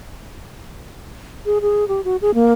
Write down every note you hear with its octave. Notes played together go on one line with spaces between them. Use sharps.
G#4
G#4
G4
F#4
G#4
A#3